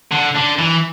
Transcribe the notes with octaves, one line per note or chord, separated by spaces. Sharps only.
D3
D3
E3